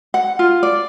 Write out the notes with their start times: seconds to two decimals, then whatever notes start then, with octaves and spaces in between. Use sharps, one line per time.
0.14 F#5
0.39 F4
0.63 D5